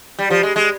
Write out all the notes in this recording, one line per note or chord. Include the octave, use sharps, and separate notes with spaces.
G3
F3
G#3
G#3